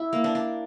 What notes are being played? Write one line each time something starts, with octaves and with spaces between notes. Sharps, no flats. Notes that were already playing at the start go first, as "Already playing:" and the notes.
Already playing: E4
A#3
D4
D4